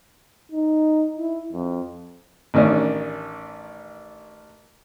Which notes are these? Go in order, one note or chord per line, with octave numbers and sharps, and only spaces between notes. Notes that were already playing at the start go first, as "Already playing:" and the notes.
D#4
E4
F2
A1 D#3 C#4 D4